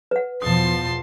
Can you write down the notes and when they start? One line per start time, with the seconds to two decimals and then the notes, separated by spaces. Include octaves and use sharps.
0.11 B4 F#5
0.42 E2 B2 F3 A5 C6 D#6